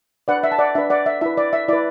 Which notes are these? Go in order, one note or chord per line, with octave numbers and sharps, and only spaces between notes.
D4 B4 D5 F#5
E5
A5
D5 F#5
D4 B4 E5
D5 F#5
E5
E4 B4 E5
D5
E5
E4 B4 D5